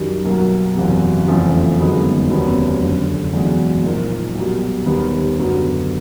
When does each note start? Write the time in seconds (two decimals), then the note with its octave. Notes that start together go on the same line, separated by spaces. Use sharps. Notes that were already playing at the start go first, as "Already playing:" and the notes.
Already playing: F#2 D#3 G3
0.25 B1 B2 F#3 A#3
0.76 F#1 E2 C3
1.27 F1 E2 C#3 F3 A3
1.79 G1 F#2 D#3 G#3 B3
2.29 F1 D#2 C#3 F#3 B3
2.81 F#1 F2 D3
3.33 F#1 E2 B2 G#3
3.84 A#2 F3 A#3 D#4
4.35 B1 B2 G3
4.86 D#2 D#3 G3 B3
5.37 F#1 F#2 D3 F#3 B3